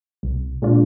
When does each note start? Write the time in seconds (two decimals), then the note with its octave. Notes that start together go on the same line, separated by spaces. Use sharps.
0.23 C2
0.62 A#2 G#3 D4 F4